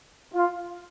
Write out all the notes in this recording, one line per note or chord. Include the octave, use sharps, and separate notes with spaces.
F4